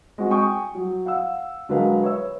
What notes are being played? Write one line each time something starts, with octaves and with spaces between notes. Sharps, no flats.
G#3 C4 F#4
G5 G#5 C#6 D#6
F#3
F5 F#5 E6
D3 F#3 G#3 A#4 B4 F5
B4 C#5 E5 E6